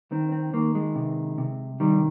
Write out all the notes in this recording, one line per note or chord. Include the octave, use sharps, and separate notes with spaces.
D#3 C4
C4
D#3 A#3
G#3
C3
C3
D#3 G3